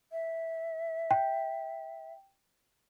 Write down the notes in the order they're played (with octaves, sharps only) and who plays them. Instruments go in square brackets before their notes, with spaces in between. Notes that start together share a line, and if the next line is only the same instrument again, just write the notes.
[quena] E5
[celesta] G5